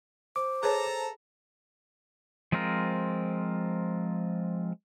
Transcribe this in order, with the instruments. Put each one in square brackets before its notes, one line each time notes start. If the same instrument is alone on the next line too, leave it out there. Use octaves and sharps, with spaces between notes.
[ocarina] C5 [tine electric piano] D6
[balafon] G#4 B4 C#5 [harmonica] A4 A5 A#5
[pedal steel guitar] F3 G#3 C4 F4 A#4